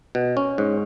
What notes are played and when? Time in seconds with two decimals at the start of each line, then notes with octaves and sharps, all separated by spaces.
0.15 B2
0.37 C#4
0.58 G#2